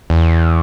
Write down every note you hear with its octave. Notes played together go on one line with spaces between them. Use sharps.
E2